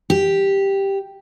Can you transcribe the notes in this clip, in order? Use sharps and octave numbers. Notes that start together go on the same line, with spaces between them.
G4